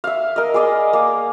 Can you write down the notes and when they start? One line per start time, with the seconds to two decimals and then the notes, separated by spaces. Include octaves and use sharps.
0.04 E5 F5
0.36 A#4 D#5
0.54 G#4 B4 D5 D#5
0.93 A#3